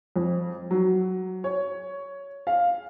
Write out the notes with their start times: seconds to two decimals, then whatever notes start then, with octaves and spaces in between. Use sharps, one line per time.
0.16 F2
0.71 F#3
1.44 C#5
2.47 F5